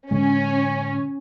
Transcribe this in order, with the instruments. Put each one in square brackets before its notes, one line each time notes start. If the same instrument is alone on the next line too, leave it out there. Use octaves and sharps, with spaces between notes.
[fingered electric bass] A2 D3 G#3 [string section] C#4